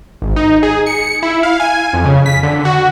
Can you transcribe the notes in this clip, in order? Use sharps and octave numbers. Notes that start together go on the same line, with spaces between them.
G#1
D#4
G#4
C#7
E4
F5
G#5
F2
C#3
B6
D3
F#4